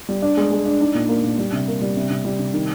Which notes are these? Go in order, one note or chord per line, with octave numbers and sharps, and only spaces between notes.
G3
D4
G#3
G#3
D4
D#4
A#2
A#3
A#2
G3
C3
A#3
G3
C3
C3
G3
C3
D#3